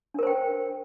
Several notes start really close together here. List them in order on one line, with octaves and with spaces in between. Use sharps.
D4 A#4 C5 G5